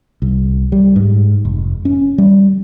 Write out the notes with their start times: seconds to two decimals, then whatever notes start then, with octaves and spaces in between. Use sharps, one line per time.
0.22 C2
0.72 G3
0.96 G#2
1.45 F1
1.85 C#4
2.18 G3